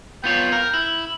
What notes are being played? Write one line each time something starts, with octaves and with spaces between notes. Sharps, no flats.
B3 F4 C#5 G5
A#4
E4